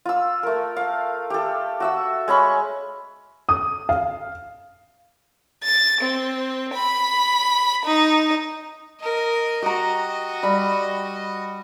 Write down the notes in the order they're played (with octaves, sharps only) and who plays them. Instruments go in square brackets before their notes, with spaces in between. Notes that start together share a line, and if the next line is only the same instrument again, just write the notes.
[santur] F4 E6
A3 A#4
F5
G4 A4
F#4 E5 E6
G#3 C#4 B5 C#6
[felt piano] D#6
F5
[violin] A6
C4
B5
D#4
[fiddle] A#4 D#5
[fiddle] F#4 D#5 [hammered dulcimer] G4 A#5
[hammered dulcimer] G3 B5